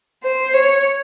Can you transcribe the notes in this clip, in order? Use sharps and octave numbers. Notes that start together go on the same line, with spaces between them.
C5
C#5